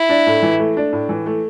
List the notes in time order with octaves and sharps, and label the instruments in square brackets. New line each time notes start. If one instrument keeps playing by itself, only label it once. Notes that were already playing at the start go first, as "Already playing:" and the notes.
Already playing: [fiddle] E4
[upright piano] D4
A2
E3
A3
D4
A2
E3
A3